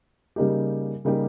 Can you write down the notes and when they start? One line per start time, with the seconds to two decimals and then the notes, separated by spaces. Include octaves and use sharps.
0.36 C#3 G3 A#3 D#4 G4
1.05 C#3 G3 A#3 D#4 G4